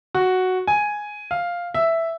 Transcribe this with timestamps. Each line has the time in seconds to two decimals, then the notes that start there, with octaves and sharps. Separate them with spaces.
0.15 F#4
0.67 G#5
1.31 F5
1.74 E5